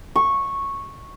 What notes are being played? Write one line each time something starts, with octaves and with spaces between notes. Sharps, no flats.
C#6